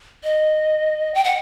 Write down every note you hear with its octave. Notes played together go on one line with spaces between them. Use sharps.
D#5
G5
F#5